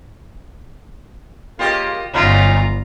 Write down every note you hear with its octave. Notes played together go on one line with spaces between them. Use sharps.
C#3 A#3 F4 G4 D#5
G1 A#2 F#3 C#4 D#4 F4 E5 A#5